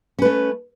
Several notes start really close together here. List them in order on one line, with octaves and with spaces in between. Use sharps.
C#4 B4 A3